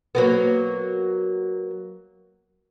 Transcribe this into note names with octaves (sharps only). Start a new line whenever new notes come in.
F#3 A#3 B3